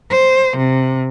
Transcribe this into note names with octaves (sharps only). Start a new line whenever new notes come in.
C5
C3